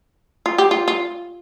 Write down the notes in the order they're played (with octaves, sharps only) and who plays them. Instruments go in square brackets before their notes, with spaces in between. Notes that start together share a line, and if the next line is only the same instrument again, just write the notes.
[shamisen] F4
G4
F4
F4